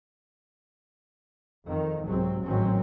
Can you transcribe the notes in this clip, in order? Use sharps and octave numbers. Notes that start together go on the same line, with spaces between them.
F2 D#3
C2 G#2 F#3 C4
A1 G#2 D#3 F#3 C4 C#4